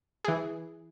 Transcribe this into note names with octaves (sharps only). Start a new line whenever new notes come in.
E3 G#4